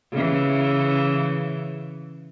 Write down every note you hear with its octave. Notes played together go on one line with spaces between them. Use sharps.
C#3 E3